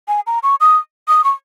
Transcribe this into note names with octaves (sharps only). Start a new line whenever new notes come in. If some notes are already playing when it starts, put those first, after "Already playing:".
G#5
A#5
C#6
D#6
D#6
C#6